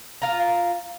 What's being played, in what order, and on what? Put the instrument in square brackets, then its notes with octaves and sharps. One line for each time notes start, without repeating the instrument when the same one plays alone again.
[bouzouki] F4 A#5